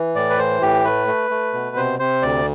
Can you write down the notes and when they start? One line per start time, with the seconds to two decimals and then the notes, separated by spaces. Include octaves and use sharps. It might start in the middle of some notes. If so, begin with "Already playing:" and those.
Already playing: E3
0.15 A2 D5
0.30 B4
0.38 E3 C5
0.62 A2 G4
0.84 A3 B4
1.07 A3
1.31 A3
1.53 B2
1.76 C3 C5
1.99 C3 C5
2.22 D2 D5